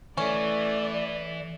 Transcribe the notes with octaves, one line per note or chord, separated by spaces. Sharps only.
E3 A3 C#4 D5